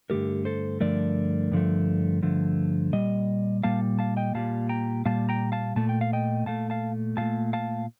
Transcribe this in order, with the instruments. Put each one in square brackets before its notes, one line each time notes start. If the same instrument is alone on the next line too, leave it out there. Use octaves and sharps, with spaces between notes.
[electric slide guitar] G2 D3 F3 A3 G4 A#4
A4 C5
G2 D3 F3 A3 A#4 D5
G2 D3 F3 A3
G2 D3 F3 A3
A#2 G3 D#5
A#2 G3 A#3 F5 A5
F5 A5
D#5 G5
A#2 G3 A#3 F5 A5
G5 A#5
A#2 G3 A#3 F5 A5
G5 A#5
F5 A5
A#2 A3 A5
G5
F5
D#5 G5
A#2 A3 F5 A5
F5 A5
A#2 A3 F5 A5
F5 A5